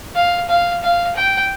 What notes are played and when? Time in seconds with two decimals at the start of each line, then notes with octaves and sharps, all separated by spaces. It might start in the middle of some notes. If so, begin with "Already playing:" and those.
0.15 F5
0.49 F5
0.82 F5
1.16 G5